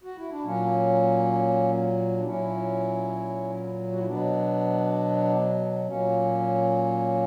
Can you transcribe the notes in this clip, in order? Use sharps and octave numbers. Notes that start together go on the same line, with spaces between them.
F#4
E4
D4
A#2 F#3 A#3 C#4
D4
A#2 F#3 C#4 E4
F#4
E4
B2 F#3 B3 D4
A#2 F#3 A#3 C#4